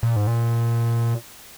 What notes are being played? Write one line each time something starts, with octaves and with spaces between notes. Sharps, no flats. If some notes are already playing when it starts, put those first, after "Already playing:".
A#2
G#2
A#2